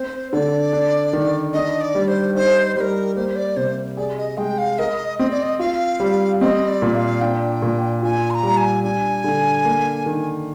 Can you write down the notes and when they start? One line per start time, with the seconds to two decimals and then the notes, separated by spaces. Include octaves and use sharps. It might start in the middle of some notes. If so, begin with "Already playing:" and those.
Already playing: C4 C5
0.32 D3 D5
0.73 D4
1.13 D#3
1.54 D4 D#5
1.81 D5
1.95 G3
2.08 C5
2.35 D#4 C5
2.76 G3 A#4 C5
3.16 A#3 C5
3.36 D5
3.57 C3 C5
3.97 G#4 D5
4.18 D#5
4.38 G#3 G5
4.58 F5
4.79 A#4 D#5
5.19 C4 D#5
5.31 D5
5.42 D#5
5.60 F4 F5
6.00 G3
6.40 C4 D#5
6.68 D5
6.82 A#2
6.95 F5
7.22 D4 G5
7.62 A#2
8.02 F4 G#5
8.30 C6
8.35 A#5
8.43 G3
8.57 G#5
8.84 D4 G#5
9.24 D3
9.65 A#3
10.06 D#3